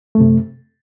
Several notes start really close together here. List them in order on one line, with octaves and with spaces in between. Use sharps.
A3 F#2 C3